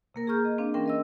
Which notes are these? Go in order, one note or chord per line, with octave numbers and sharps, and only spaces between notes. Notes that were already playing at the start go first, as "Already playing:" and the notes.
C3 A#3 A#4
G#4 A#5 C#6 F6 G6
D#5
C4 D4 F5
E3 C#4 A#4 G5 C6
A#4 D#5 E6